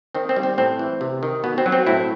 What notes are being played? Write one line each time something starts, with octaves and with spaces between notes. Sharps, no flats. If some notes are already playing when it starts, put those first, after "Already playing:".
D#3 C4
C4
G3
C4
A2 C4
E3
C3
D#3
B2 B3
C4
F#3
C4
A2 C4 E4